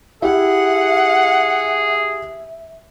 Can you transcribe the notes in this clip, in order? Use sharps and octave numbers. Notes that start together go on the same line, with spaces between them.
E4 G4 G#4 E5 F#5